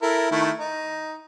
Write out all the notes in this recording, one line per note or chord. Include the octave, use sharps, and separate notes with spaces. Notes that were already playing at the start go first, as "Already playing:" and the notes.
E4 A4 A#4
D#3 A3 E4
D#4